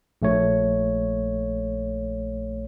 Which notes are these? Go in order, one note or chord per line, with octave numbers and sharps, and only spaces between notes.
A#1 A3 C#5